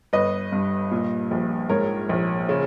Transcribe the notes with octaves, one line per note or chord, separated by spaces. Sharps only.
G1 B4 D#5
G2
A#2
A#1
G#2 A#4 C#5
A#1
C#3